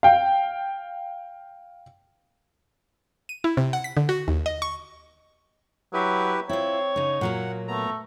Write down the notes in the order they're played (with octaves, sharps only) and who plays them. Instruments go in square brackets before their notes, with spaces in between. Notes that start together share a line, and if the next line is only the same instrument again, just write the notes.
[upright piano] F5 G5
[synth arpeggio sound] D#7
E4
C3
F#5
B6
D3
F#4
D#2
D#5
C#6
[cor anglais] F#3 [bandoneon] E4 G4 B4
[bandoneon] C4 [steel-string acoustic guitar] E4 F4 [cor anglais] C#5
[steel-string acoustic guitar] C#3 D#4
[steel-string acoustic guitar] A#2 F#3 A#3 [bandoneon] F#5
[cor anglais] A3 [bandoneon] B3 A#5